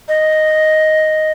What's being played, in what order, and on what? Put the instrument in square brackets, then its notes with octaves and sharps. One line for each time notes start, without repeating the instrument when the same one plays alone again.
[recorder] D#5